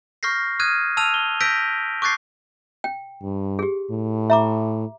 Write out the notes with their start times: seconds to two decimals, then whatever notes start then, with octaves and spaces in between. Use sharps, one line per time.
0.23 C#6 F6 G6 A#6 C7
0.60 D#6 F6 F#6 G#6 D#7
0.97 A5 E6 F6 D#7 F7
1.14 G7
1.41 E6 G6 A#6 B6 D7
2.02 C#6 D6 F#6 G6 A6 C7
2.84 G5
3.22 G2
3.59 G4 G#4
3.91 A2
4.30 E5 A#5 D6